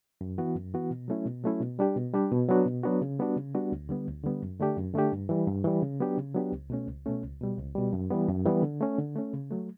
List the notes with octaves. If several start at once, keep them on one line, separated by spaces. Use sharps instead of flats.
F#2
E3 B3 F#4
F#2
E3 B3 F#4
B2
F#3 A3 C#4 E4
B2
F#3 A3 C#4 E4
B2
G3 D4 G4
B2
G3 D4 G4
B2
F#3 B3 D4 F#4
B2
F#3 B3 D4 F#4
C#3
G3 B3 D4 F#4
C#3
G3 B3 D4 F#4
D2
D3 G3 B3
D2
D3 G3 B3
F#2
D3 A3 D4 G4
F#2
D3 A3 D4 G4
G2
E3 G3
G2
E3 G3
C#3
F#3 B3 D4 G4
C#3
F#3 B3 D4 G4
C#2
B2 A3 C#4
C#2
B2 A3 C#4
C#2
B2 G3
C#2
B2 G3
F#2
E3 G3 B3
F#2
E3 G3 B3
D3
A3 C#4
D3
A3 C#4
C#3
F#3 A3